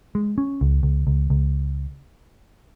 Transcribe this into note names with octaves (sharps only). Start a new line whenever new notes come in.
G#3
C#4
C#2
C#2
C#2
C#2